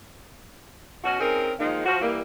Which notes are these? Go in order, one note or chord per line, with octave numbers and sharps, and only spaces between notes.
B2 C#4 F#4
C4 C#4 D#4 G#4 A#4
D#3 F3 G#3 A#3 D#4
F3 F#4
E3 G3 A#3